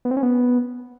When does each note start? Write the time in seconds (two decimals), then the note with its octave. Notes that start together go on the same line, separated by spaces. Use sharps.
0.05 B3
0.11 C4
0.17 C#4
0.23 B3